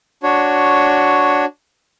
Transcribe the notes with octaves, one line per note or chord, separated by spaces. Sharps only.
D4 F#4 C#5